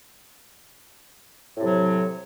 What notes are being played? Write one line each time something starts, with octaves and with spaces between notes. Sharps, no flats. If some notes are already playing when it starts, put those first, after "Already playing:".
A2 C3 F#3